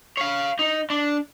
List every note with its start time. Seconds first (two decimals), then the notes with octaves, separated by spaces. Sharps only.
0.17 C#5 F5
0.59 D#4
0.90 D4